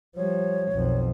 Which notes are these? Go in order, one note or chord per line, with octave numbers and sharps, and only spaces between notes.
F3 G3 C#5
B1 F2